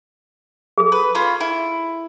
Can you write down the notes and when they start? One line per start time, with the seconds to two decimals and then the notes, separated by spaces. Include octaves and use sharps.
0.78 G#4 A4
0.92 B4
1.15 C#4 F4 B5
1.40 E4